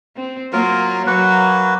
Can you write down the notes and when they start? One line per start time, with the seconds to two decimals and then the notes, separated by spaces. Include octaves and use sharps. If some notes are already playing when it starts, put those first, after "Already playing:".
0.16 C4
0.53 F#3 A#3 F4 A#4
1.07 F#3 A#3 F#4 B4